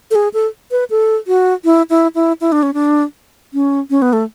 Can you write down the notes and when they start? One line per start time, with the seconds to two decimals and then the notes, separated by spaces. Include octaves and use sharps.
0.11 A4
0.15 G#4
0.34 A4
0.71 B4
0.90 A4
1.27 F#4
1.65 E4
1.90 E4
2.15 E4
2.41 E4
2.52 D4
2.63 C#4
2.74 D4
3.54 C#4
3.90 C#4
4.02 B3
4.13 A3